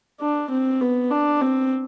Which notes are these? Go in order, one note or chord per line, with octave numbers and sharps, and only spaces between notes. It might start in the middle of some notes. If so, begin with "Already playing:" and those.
D4
C4
B3
D4
C4